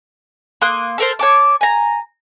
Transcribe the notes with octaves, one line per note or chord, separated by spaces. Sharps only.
A#3 C6 D#6 F#6
A4 A#4 C5
C#5 A5 D6
G#5 A#5